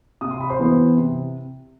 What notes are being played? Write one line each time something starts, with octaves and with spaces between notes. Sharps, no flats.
C3 D#6
C6
B5
C5 C6
E3 B3 E4
C3